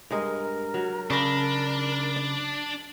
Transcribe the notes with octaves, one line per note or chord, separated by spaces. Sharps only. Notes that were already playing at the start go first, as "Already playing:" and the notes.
G2 G#3 A#4 D#5
F#3
C#3 D4 B5 A#6
D5